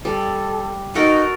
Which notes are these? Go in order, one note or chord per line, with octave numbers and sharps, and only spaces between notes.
G3 A4
D#4 F#4 A4 A#4